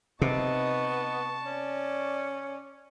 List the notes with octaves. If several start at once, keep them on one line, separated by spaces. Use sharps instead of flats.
C3 B3 D#4 A5 C#6
C#4 D5